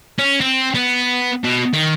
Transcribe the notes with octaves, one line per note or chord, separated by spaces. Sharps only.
C#4
C4
B3
B2
D#3